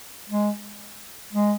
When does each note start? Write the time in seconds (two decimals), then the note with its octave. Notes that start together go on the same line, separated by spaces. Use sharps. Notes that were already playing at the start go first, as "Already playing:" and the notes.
0.30 G#3
1.33 G#3